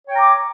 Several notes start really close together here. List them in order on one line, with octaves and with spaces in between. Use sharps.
C#5 G5 A#5 D6